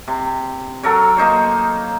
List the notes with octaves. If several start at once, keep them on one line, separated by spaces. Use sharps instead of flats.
C3
F#3 A4 A#4 C#5
A#3 D#4 C5 C#5